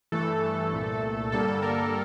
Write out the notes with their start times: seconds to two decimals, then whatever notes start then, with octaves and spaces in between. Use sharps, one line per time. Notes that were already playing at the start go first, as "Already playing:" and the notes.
0.12 G2 E3 A3 A4
0.72 C2 A#2 A3
1.32 G2 D3 G3 A#3 A4
1.62 A#4